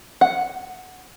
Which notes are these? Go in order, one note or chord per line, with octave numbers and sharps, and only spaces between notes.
F#5